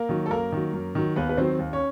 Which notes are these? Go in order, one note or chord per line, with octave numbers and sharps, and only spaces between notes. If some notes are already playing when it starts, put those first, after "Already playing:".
Already playing: A#3 A#4
D#3 F#3
A4
F#2 A#3 A#4
D#3 F#3
F#2
D#3 F#3
D#2 B3 B4
B4
D#3 F#3 C4 C5
D#2
C#4 C#5